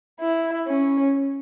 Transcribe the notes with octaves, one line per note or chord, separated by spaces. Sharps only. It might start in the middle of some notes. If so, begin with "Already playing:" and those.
E4
C#4